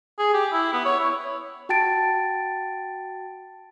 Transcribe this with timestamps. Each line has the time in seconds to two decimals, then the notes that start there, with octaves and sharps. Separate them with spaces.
0.19 G#4
0.34 G4
0.52 E4
0.73 B3
0.85 C#5
1.00 E4
1.69 F#4 G5 A5 A6 D7